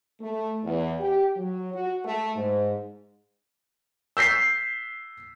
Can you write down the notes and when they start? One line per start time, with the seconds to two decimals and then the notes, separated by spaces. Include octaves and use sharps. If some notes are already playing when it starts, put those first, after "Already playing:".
0.21 A3
0.63 E2
1.00 G4
1.36 F#3
1.73 F#4
2.04 A3
2.36 G#2
4.17 E6 G6 B6 C7